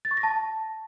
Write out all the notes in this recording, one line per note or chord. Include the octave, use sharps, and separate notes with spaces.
A6
C#6
A#6
A5